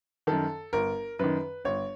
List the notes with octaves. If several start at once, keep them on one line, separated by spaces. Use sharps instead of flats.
F#2 D#3 A4
G1 A#4
F#2 D#3 B4
G1 C#5